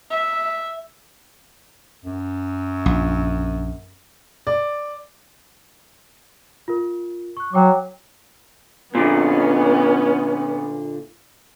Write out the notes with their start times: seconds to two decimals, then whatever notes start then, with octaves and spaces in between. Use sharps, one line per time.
0.11 E5
2.05 F#2
2.86 A#1
4.47 D5
6.68 F4 A#4
7.37 C#6 F#6
7.53 F#3 C#5 G5 D6
8.95 A#2 D3 B3 C#4